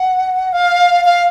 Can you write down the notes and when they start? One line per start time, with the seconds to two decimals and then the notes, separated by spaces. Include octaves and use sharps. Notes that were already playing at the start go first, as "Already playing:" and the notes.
Already playing: F#5
0.53 F5
1.04 F5